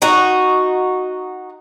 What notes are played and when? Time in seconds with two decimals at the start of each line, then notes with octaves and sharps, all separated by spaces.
0.02 D#4 F#4